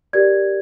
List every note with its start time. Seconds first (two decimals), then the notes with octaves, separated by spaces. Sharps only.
0.13 G4 A#4 D5 G#6